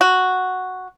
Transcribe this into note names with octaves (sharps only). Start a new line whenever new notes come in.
F#4